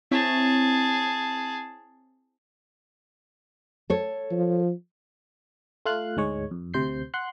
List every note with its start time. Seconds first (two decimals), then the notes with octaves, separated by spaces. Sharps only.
0.11 C4 E4 G#4 C#5 A5
3.90 A4 C#5
4.31 F3
5.86 A3 F4 F5 F#6
6.16 D2 G#2 G#3 C#5
6.51 F2
6.74 D2 C3 C5 G6 C7
7.14 F#5 C6 F#6